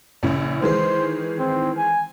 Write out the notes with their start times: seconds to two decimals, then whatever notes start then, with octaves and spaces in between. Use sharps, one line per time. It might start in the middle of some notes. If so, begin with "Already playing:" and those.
0.23 A#1 C#3 E4
0.62 D#3 E3 G#3 C5
1.39 C4
1.77 G#5